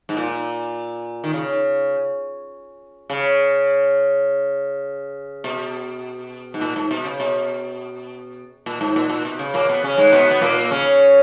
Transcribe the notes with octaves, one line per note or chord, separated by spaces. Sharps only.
G#2
A#2
D#3
C#3
C#3
B2
G#2
A#2
G#2
B2
C#3
B2
A#2
G#2
A#2
A#2
B2
C#3
A#2 A#3
B2 B3
C#3 C#4
G#2 G#3
B2 B3
B3
A#2 A#3
C#3 C#4